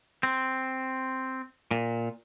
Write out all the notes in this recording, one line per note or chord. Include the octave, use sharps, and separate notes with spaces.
C4
A#2